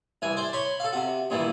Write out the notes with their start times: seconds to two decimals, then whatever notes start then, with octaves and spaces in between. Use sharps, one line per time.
0.22 C2 E3 G#5
0.37 C5 D5
0.53 C#5 B5 C6
0.80 A4 F5
0.93 C3 F#4
1.30 G2 A#2 D#3 E3